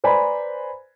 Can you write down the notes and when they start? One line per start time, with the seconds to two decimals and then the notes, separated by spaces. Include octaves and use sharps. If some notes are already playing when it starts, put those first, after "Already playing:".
0.04 B4 C5 D5 G#5 A#5 B5